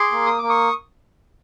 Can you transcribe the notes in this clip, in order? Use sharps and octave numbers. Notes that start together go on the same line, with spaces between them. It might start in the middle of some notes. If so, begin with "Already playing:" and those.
Already playing: G#4 C6 D6
A#3
D#6
A#3 D6
C#6 D#6